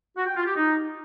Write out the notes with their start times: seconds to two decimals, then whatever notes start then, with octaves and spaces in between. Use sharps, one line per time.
0.17 F#4
0.27 G5
0.36 F4
0.46 G4
0.56 D#4